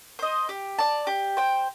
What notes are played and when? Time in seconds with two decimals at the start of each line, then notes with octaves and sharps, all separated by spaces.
0.19 C5 D#5
0.49 G4
0.78 D5 A5
1.07 G4
1.37 C5 G5